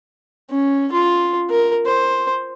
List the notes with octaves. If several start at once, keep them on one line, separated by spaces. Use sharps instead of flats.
C#4
F4
A#4
C5